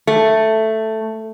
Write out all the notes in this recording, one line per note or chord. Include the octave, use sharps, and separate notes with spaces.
A3